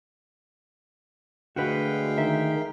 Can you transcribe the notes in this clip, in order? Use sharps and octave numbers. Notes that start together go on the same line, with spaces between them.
D2 G#3 F#4 B4 F5 G5
D#3 D#4 E5